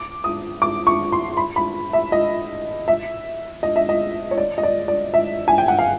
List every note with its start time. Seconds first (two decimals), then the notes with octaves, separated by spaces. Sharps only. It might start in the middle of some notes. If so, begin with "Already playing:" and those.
Already playing: D6
0.24 D#6
0.62 D6
0.87 C#6
1.12 C6
1.37 B5
1.56 B5
1.93 E5
2.12 D#5
2.88 E5
3.63 D#5
3.76 E5
3.89 D#5
4.31 C#5
4.38 D5
4.58 D#5
4.63 D5
4.88 D5
5.14 E5
5.48 G#5
5.58 G5
5.68 F#5
5.79 F5